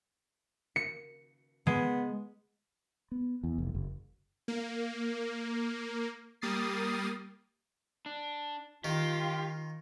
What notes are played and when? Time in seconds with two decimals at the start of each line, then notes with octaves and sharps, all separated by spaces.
0.76 C#7
1.67 G#3 B3
3.12 B3
3.44 E2
3.58 F1
3.75 F#1
4.48 A#3
6.41 G3 A#3 D#6 A6 C7
8.06 D4
8.84 D#3 F4 G4